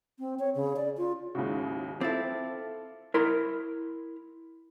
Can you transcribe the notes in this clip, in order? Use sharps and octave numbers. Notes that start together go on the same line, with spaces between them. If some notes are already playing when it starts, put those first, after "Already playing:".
C4
C#5
C#3
D5
F4
D#2 G#2 C#3 E4 F#4
C4 E4 F4 A4 D6 A6
E4 A#4 C6